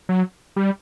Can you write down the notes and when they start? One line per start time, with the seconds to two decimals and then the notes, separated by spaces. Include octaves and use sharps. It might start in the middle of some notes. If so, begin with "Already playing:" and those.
0.09 F#3
0.56 G3